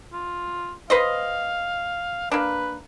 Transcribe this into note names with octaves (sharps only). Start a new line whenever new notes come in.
F4
B4 C5 D#5 F5
A#3 D4 B4